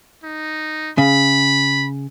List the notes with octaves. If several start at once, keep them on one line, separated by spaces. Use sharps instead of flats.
D#4
C#3 B5